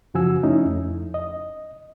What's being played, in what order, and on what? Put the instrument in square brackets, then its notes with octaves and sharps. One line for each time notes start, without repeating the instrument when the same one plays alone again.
[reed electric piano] F#2 C#3 F3 F#4 G#5 E6
A3 C#4 D#4 E4
F2
D#5